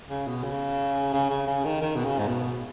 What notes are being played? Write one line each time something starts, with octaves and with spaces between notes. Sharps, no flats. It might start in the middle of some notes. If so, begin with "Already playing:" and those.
C#3
B2
C#3
C#3
C#3
C#3
D#3
D#3
B2
C#3
G#2
B2